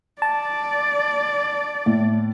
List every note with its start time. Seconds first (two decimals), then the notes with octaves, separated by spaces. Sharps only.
0.22 D5 A5
1.86 A2